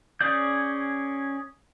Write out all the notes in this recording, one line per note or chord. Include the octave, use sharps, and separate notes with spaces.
C#4 G#4 D5 G6